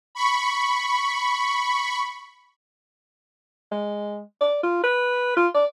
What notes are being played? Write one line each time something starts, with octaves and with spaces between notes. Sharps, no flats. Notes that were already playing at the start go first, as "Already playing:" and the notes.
B5 C#6
G#3
D5
F4
B4
F4
D5